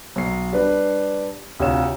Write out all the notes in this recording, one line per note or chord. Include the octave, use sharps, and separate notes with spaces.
B1 C7
G3 D4 B4
D2 C3 F4 C#5 E7